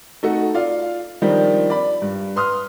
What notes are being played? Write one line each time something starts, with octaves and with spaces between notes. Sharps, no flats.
A3 D#4 F#4 A4
F4 D5 F5
D#3 F3 G3 C4 D4
D5 B5
G2
B4 C6 D#6 F6